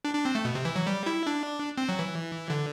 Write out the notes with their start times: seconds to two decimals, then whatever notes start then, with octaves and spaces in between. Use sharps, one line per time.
0.05 D4
0.15 D4
0.25 C4
0.35 A3
0.45 B2
0.55 C3
0.65 E3
0.76 F#3
0.87 G3
1.06 E4
1.27 D4
1.78 C4
1.89 F#3
1.99 E3
2.50 D3